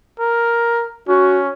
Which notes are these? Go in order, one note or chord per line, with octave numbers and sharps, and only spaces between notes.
A#4
C#4 F#4